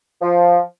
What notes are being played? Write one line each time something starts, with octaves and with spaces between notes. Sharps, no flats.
F3